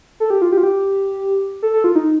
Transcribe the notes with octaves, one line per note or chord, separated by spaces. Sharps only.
A4
G4
F4
G4
F4
G4
A4
A4
F4
D#4